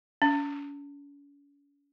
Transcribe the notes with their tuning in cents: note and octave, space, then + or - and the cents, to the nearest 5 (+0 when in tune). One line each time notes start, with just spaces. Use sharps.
C#4 +40